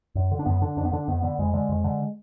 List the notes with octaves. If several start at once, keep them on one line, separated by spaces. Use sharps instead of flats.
F#2
D3
D4
F#2 B3
D3 D4
F2 D4
B3
D3 D4
F2 B3
D3 B3
F2 G#3
D3 G#3
F2
D3